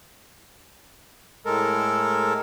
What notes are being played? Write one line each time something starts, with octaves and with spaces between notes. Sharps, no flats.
A2 G#3 A4 A#4